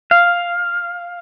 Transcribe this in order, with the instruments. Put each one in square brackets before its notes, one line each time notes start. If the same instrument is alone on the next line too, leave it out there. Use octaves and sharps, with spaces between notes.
[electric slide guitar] F5